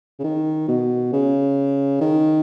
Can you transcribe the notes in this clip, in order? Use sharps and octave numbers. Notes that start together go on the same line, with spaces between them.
C#3
D#3
B2
C#3
D#3